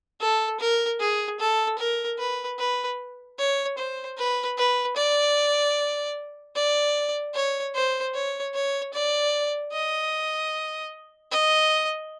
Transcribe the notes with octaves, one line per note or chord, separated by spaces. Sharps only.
A4
A#4
G#4
A4
A#4
B4
B4
C#5
C5
B4
B4
D5
D5
C#5
C5
C#5
C#5
D5
D#5
D#5